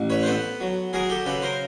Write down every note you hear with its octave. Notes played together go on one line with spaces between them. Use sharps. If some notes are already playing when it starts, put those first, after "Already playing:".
Already playing: A1
B4 C#5
C5
B3 A4 B4
F#3
F#3 G#4 A#4
G4 A4
C#3 A4 B4
A#4 C5